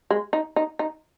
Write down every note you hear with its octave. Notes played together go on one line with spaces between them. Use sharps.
G#3
D#4
D#4
D#4